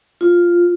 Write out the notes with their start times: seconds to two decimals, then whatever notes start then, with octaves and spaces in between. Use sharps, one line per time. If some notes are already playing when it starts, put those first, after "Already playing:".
0.21 F4